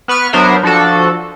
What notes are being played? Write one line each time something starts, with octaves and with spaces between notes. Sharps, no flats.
B3 B4 C#6 F6
F#3 B3 D4 A#4 C5 E5
F3 D4 F#4 A4